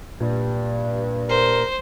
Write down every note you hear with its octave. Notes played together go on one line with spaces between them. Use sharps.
G2 A#2
A#4 C5